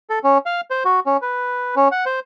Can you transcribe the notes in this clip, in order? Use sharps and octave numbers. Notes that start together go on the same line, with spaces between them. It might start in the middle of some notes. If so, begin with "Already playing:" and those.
A4
C#4
F5
C5
F#4
C#4
B4
C#4
F#5
C5